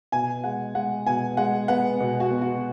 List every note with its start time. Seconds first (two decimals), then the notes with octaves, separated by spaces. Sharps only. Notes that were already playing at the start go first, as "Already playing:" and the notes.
0.12 B2 G#5
0.44 G#3 F#5
0.75 G#3 F#5
1.07 B2 G#5
1.37 G#3 F#5
1.68 B3 F#5
2.00 B2
2.20 F#4
2.31 B3
2.42 F#4